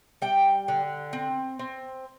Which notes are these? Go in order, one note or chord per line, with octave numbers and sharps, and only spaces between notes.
G3 G5
D3
C4
C4